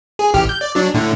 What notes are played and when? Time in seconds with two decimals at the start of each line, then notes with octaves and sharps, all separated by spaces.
0.19 G#4
0.34 A1 G4 F6
0.49 G6
0.61 D5
0.75 F#3 D4
0.94 A2 D3